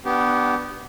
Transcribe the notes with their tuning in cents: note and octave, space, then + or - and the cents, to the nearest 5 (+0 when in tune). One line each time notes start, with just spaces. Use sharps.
B3 +0 D4 +0 G4 -20